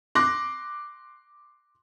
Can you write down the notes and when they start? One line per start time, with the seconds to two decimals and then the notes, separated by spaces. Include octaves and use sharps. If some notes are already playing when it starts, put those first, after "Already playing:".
0.15 C6 D6 F#6 A#6